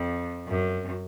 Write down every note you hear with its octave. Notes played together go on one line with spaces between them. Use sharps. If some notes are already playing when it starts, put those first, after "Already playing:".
Already playing: F2
F#2